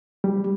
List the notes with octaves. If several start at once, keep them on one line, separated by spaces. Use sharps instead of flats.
G3